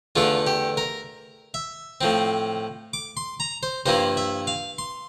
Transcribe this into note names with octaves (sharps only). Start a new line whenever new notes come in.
E2 D3 A3 D4 F4
G4
A#4
E5
A2 F3 C4
D6
C6
A#5
C5
G2 F3 A#3 E4 C5
E5
F5
C6